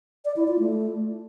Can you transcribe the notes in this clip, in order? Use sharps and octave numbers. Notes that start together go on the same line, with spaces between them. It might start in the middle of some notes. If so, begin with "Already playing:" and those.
D5
E4
F4
A3